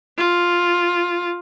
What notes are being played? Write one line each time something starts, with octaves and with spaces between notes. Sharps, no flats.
F4